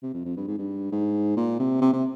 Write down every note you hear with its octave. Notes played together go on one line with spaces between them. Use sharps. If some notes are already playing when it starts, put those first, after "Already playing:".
C3
F2
F2
G2
G#2
G2
G#2
A#2
C3
C3
C3